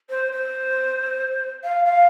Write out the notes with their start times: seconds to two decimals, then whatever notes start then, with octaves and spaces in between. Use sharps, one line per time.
0.09 C5
0.32 C5
1.64 F5
1.85 F5